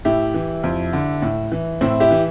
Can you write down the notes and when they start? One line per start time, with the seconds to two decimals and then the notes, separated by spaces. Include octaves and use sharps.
0.05 A2 E4 G4
0.34 E3
0.64 F2
0.93 D3
1.22 A2
1.52 E3
1.81 A2 C4 E4
2.00 E4 G4
2.11 E3